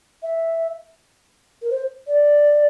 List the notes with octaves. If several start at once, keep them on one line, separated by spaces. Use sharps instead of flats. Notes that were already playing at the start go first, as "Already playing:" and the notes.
E5
A#4
C5
D5